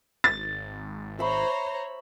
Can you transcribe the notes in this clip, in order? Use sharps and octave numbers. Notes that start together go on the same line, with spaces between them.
G#1 A6
C5 C#5 E5 A#5 B5 C#6